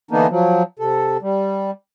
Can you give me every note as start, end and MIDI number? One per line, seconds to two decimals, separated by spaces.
0.11 0.27 50
0.11 0.27 52
0.11 0.27 58
0.11 0.27 59
0.11 0.27 62
0.11 0.27 63
0.30 0.63 53
0.30 0.63 54
0.79 1.17 48
0.79 1.17 69
1.22 1.71 55